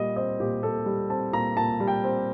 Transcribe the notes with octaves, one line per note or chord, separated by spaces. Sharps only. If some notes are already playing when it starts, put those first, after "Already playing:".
Already playing: A#2 G3 D#5
C4 D#5
A#2 G4
A#2 A4
G3
C4 A5
A#2 A#5
A#2 A5
G3
G5
C4